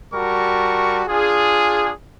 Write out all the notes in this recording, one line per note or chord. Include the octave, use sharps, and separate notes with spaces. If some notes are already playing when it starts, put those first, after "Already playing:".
G3 F#4 A#4 A5 C#6
D4 F4 G#4